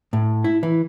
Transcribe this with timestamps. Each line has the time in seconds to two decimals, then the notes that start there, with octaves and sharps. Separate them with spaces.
0.13 A2
0.44 E4
0.63 E3